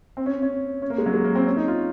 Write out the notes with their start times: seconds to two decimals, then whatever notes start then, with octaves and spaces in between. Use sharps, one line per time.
0.17 C4
0.26 C#4
0.42 C#4
0.82 C#4
0.90 A#3
0.98 G#3
1.06 F#3
1.14 G#3
1.24 A#3
1.35 C4
1.47 C#4
1.57 D#4
1.68 F4